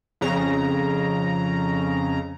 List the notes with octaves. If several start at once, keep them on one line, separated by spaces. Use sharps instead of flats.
F2 C#3 A#5